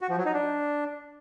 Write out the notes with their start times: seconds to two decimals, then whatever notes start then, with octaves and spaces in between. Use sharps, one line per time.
0.01 F#4
0.09 F3
0.17 F#3
0.25 D#4
0.33 D4